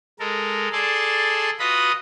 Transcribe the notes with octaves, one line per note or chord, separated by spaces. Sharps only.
G#3 A4 A#4
G#4 A4 D5 A5 C6
F4 F#4 B4 D#5 B5 D#6